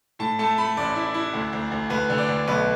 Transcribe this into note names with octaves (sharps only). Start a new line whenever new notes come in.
A2 A5
A3 A5
A3 B5
A1 D5
E4
E4
D2
D2
D2
D2 B4
D3
D5
D2
B1 B4